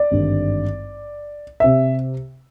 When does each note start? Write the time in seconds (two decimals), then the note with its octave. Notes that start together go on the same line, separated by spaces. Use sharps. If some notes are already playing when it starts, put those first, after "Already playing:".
Already playing: D5
0.11 G#1 G2 D3
1.60 C3 E5